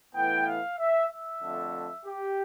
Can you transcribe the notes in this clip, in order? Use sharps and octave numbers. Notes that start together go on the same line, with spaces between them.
A2 E3 B3 G5
F5
E5
E5
F2 D3 A3
G4